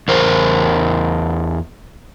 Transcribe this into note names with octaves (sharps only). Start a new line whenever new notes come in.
E2 A#4 C5